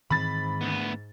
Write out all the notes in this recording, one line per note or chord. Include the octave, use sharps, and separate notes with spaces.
G#2 D#3 E3 C4 B5 A6
D2 B3